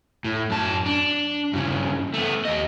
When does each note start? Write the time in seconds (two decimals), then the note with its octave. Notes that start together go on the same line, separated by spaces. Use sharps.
0.24 A2
0.50 F#2 A5
0.86 D4
1.53 G2 C#3
2.14 A3 B3
2.45 D#2 D#5